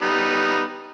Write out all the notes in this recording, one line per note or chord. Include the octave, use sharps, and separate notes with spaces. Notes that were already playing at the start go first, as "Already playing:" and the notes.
G3 B3 D#4